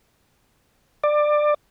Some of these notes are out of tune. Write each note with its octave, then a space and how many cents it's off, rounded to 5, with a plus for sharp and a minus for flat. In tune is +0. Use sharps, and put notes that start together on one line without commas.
D5 +20